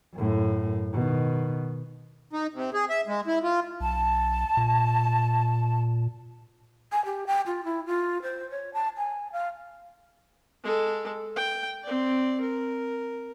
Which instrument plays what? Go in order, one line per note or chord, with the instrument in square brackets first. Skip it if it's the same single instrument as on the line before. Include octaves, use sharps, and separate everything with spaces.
[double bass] F#2 A2
B2 D#3
[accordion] D#4
C3
G#4
E5
G#3
E4
F4
[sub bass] B1 [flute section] A5
[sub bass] A#2
[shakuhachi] G#5
G4
G5
F4
E4
F4
C5
C#5
A5
G#5
F5
[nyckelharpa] G#3 A4
G5
C4 D5
A#4